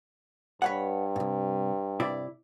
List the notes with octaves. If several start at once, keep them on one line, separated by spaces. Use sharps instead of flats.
G2 B4 C#5 F#5
C2 G#2
C3 E4 D5